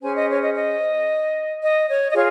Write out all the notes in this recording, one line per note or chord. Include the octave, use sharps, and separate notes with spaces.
C#4 G#4 C5 G#5
D#5
C#5
D#5
D#5
D#5
C#5
D#5
F4 G#4 C#5